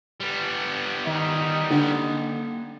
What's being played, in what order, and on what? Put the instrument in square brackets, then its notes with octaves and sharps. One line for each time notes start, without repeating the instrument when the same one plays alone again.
[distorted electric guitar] G3 B3
[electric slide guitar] D#3 [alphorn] D#4
[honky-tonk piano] D3 [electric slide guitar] A#3 F#5 G5